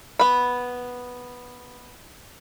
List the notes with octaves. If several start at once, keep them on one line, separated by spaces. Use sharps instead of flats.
B3 B5